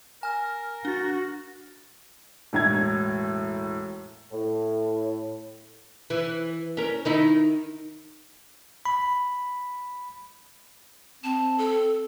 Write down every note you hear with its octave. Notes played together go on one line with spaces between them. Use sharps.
A#4 G#5 F6
D4 F#4 A6
E1 A2 A#5 G#6
A2
E3
C#4 A#4
D#3 D#4 E4
B5
C4 A5
A4